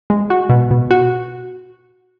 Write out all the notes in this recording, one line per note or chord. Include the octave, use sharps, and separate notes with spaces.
G#3
F#4
B2
B2
F#4